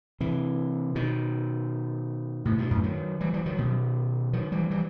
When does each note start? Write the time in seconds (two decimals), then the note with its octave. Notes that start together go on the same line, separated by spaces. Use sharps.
0.20 C3 E3
0.95 B2 D#3
2.45 A2 C3
2.58 G2 B2
2.71 F#2 A2
2.83 D#3 F#3
3.20 E3 G3
3.33 E3 G3
3.46 D#3 F#3
3.58 B2 D#3
4.33 D#3 F#3
4.52 E3 G3
4.71 E3 G3